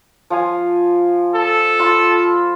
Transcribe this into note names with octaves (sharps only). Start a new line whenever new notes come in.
F3 F5 G#5
A4
F4 B5